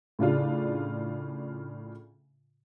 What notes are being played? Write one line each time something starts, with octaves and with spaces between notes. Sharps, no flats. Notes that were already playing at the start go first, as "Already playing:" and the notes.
A2 C#3 D4 F4